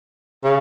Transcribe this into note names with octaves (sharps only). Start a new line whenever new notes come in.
C#3